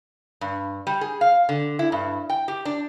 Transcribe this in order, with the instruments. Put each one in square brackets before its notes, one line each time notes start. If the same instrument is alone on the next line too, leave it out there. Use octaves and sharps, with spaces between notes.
[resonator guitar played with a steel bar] G2
G3
G#4
F5
D3
E4
G2
G5
G4
D4